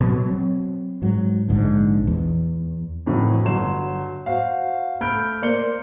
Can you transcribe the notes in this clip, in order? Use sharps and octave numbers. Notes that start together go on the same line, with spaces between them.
B2 F#3
F#3 C4
G#2 F#3
A#1 G#2 D3
E2
F2 A2 E3 F#3
G1 F#3 C6 E7
F#4 C5 F5
A3 B5 F6 G6 D7
A#3 C5 D5 C6 C#7 G7